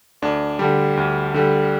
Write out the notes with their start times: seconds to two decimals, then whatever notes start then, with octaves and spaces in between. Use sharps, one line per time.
0.22 D2 D4
0.59 D3 G3
0.97 D2
1.34 D3 G3